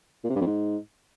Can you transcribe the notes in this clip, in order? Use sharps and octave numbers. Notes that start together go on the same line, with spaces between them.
A#2
C3
G2
F2
G#2